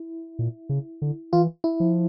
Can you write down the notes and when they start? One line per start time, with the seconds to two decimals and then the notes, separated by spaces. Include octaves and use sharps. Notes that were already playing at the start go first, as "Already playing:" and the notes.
Already playing: E4
0.39 A#2
0.69 C#3
1.02 D3
1.33 E3 F4
1.64 E4
1.80 F3